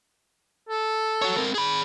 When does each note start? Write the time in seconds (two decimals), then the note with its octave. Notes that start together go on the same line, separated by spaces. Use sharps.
0.69 A4
1.22 F#4 C#5
1.37 C4 A#4
1.54 G#4 B5